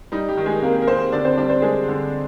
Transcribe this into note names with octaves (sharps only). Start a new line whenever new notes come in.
G3 D#4
G3 G4
D#3
G#3 G#4
C3 A#3 A#4
A#4
C3 C4 C5
D3 D4 D5
C4 C5
G3 D4 D5
C4 C5
G3 G#3 G#4
D3